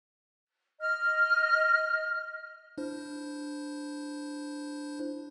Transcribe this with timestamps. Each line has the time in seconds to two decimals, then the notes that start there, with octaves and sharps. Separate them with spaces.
0.80 D#5 F6
2.78 D4 E4 C5